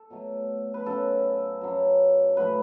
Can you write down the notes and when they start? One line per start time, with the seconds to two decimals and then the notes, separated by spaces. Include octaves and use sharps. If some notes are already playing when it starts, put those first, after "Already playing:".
Already playing: A4
0.10 B2 F#3 A3
0.74 B4
0.85 F#2 C#3 F#3 A4
1.61 F#2 C#3 F#3
2.37 A2 F#3 A3 B4